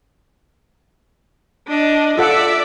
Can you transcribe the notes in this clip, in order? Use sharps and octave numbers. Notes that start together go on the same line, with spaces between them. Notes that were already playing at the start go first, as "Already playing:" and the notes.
D4 D#5
F4 A4 D5 E5 F#5